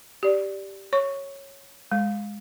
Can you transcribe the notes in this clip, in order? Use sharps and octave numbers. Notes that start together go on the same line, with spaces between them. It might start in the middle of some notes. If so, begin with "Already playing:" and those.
G4 D5
C#5 C#6
G#3